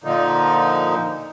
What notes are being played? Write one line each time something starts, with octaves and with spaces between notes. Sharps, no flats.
A#2 D3 F3 D#4